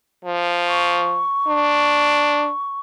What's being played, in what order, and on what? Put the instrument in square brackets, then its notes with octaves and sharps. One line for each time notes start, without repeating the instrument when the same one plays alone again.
[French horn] F3
[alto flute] C#6
[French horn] D4